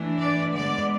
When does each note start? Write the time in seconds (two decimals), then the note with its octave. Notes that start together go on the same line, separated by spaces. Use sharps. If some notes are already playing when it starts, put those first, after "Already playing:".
Already playing: E3 A3 D4
0.19 D5
0.54 D3 G#3 B3 D5